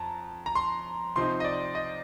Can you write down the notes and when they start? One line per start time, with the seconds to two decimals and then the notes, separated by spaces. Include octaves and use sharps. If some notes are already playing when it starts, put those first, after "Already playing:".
Already playing: F2 A5 A#5
0.46 A#5
0.55 C6
1.16 C3 F3 C4 D#4 C6
1.40 D#5
1.45 D5
1.75 D#5